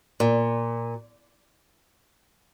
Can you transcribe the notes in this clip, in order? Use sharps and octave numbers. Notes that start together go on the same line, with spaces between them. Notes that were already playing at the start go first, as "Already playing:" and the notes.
A#2